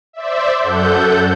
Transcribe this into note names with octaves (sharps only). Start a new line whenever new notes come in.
C5 D5 E5
F#2 A4 F#5 G6